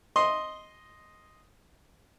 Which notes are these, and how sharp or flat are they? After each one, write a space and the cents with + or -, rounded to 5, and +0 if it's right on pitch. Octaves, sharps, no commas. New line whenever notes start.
D#5 +0 C6 +0